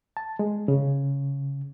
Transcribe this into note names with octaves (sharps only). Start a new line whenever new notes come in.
A5
G#3
C#3